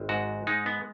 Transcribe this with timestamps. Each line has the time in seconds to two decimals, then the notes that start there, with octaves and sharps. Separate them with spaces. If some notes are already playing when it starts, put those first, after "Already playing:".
Already playing: G#1
0.09 G#2 F#4
0.47 G#3 D#4
0.66 B3